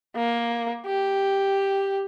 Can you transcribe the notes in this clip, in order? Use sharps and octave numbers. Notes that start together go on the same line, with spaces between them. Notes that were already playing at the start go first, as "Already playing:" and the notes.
A#3
G4